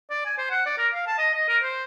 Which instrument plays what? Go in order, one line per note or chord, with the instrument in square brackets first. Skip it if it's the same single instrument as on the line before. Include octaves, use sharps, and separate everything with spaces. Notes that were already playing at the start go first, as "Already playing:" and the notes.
[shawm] D5
G#5
C5
F#5
D5
A#4
F5
A5
D#5
D#5
A#4
C5